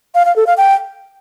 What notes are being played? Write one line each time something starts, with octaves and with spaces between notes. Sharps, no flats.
F5
F5
A4
F5
G5